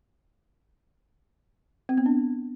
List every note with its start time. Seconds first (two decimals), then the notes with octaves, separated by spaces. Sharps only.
1.89 C4
1.97 B3
2.06 D4